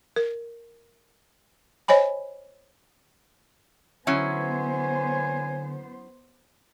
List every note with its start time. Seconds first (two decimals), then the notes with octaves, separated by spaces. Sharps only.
0.16 A#4
1.88 C5 C#5 D#5 G#5 B5
4.07 D3 F#3 B3 C#4 E4 C5 C#5 G#5